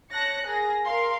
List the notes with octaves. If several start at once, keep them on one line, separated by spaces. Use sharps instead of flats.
C#5 A5 F#6 A#6 C#7
G#4 A#4 A#6
A#4 F5 C6